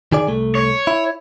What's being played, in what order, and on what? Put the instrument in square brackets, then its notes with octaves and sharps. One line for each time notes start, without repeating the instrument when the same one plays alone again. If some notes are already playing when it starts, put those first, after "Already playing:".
[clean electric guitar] D#3 G#4 D5
C2 A3
[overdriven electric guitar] C#5
[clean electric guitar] E4